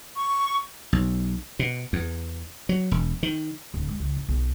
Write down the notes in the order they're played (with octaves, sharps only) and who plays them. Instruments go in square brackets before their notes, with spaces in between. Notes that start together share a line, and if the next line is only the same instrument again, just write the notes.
[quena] C#6
[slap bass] B1
B2
E2
F#3
E1
D#3
[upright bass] D1
G#3
C#2
A2
B1